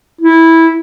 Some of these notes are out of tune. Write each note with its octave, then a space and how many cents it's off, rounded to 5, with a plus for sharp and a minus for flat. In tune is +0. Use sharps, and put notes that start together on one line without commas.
E4 -10